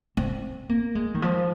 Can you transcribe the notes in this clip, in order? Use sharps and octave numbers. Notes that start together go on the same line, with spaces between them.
C4
A#3
G#3
D#3
F3